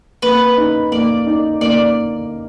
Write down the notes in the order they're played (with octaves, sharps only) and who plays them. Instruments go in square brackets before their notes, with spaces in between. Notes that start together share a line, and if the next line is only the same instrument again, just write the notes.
[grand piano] A#3 [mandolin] B4
[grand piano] D#4
[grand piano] A#3 [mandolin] D5
[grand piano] D#4
[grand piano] A#3 [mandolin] D5